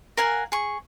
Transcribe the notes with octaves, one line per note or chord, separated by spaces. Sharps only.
A#4 F5 F#5 G#5
G#4 C#6